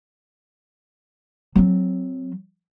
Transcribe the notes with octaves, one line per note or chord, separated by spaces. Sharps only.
F#3 C4